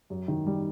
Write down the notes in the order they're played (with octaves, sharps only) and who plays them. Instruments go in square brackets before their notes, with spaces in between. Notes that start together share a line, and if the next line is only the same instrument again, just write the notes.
[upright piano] F#2
D#3
G3